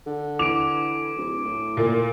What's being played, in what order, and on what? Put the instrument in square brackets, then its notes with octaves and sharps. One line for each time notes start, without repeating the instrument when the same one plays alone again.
[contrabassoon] D3
[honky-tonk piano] E3 F7 [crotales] D6 D7
[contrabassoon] D1
A2
[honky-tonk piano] A#2 A#3